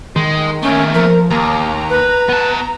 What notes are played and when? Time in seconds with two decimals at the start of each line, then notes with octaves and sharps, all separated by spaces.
0.16 D#3 G#3
0.63 A3 A#3 C#4
0.94 F3 A#4
1.31 D#2 A#3 A#5
1.90 B4
2.29 B3 A5